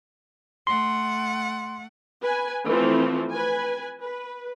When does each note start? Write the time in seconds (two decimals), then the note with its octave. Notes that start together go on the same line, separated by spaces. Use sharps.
0.67 A3 F#5 C6
2.22 B4 G#5
2.67 E3 F3 A3 C4
3.31 B4 G#5
4.01 B4